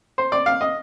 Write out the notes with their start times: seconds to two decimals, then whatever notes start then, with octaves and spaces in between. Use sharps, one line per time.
0.18 C5
0.32 D5
0.46 F5
0.61 D#5